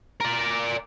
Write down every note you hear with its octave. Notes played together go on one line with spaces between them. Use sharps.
A#4 D5